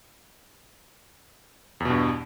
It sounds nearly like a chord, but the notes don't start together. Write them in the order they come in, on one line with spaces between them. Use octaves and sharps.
E2 B2 G2